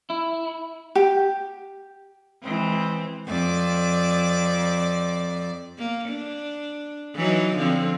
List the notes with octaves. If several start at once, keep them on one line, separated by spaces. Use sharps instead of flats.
E4
G4
E3 G#3 C4
F2 D5
A#3
D4
E3 F#3 D#4
D3 F3 C4